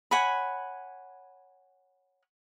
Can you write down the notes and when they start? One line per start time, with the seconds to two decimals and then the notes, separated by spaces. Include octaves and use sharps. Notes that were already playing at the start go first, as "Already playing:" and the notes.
0.11 C#5 F#5 G#5 B5